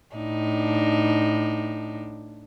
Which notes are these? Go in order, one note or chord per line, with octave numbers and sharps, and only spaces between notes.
A2 D4 D#4